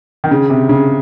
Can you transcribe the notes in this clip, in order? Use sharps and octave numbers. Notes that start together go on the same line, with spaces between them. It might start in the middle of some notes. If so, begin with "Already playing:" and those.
D#3
C#3
C3
C#3